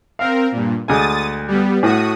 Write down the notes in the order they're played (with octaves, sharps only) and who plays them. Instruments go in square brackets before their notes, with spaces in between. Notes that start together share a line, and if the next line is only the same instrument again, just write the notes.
[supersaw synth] C4 A#4 [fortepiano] F5
[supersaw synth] G2 A#2
[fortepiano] D2 G#3 G#5 [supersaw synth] D#6 A6
[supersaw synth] G3 B3
[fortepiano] A2 [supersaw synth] F#4 D#6